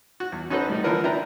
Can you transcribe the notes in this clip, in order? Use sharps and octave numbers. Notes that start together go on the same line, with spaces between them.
F#4
E2
C#4 D#4 F#4 A4 B4 C5
A2 G3 D#4
D3 E3 F3 A#3 A#4 B4
D4 E4 B4 G5 A#5